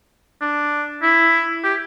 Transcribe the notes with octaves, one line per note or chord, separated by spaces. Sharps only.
D4
E4
G4